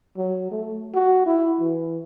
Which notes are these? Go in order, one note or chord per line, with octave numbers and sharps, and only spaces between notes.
F#3
A3
F#4
E4
E3